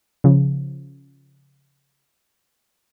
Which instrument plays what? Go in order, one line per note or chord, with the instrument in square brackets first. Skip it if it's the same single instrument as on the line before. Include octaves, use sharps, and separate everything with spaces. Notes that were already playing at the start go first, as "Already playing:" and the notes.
[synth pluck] C#3 F3